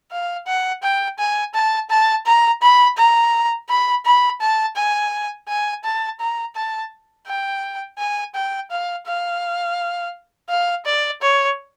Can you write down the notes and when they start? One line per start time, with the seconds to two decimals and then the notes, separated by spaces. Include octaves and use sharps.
0.12 F5
0.47 F#5
0.83 G5
1.19 G#5
1.54 A5
1.90 A5
2.26 A#5
2.62 B5
2.97 A#5
3.69 B5
4.05 B5
4.41 A5
4.76 G#5
5.48 G#5
5.84 A5
6.20 A#5
6.55 A5
7.27 G5
7.99 G#5
8.35 G5
8.71 F5
9.06 F5
10.49 F5
10.85 D5
11.22 C#5